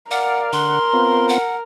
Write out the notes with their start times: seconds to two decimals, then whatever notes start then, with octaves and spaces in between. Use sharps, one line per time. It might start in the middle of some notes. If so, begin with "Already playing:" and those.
0.11 A#4 D5 F5 F#5
0.53 D3 F#5 C6
0.93 B3 C4 F4
1.29 F#5